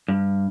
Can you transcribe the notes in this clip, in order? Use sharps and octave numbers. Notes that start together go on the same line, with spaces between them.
G2